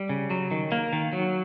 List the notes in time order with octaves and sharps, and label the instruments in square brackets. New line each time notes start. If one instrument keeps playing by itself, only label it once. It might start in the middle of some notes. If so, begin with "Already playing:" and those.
Already playing: [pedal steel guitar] G3
C#3
F#3
D#3
A#3
D#3
F#3